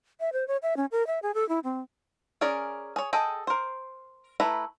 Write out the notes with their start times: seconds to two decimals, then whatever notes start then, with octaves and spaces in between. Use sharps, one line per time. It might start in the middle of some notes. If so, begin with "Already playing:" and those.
0.20 E5
0.33 C5
0.48 C#5
0.63 E5
0.77 C#4
0.92 A#4
1.07 E5
1.23 G#4
1.34 A4
1.49 E4
1.64 C4
2.41 C#4 G#4 A#4 D5
2.96 G#4 C#5
3.13 G#4 A4 D#5 G5
3.47 A#4 C5
4.40 A3 E4 B4 A#5